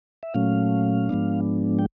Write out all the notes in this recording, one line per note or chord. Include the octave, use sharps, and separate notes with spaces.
E5
A#2 F#3 A3 C#4 F5
G#2 F3 G#3 B3 D4
G5